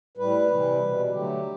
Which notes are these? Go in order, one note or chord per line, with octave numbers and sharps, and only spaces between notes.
A2 G3 B4
C3 E3 G3
B2 G3
D3 F#3 A3 G4